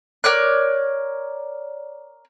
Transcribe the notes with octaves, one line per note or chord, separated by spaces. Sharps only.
A#4 C#5 D5 F#6